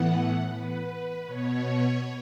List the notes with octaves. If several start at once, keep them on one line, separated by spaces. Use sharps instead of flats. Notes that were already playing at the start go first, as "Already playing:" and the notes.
Already playing: A2 E3 B3 F#5
B4
B2 B3 C#5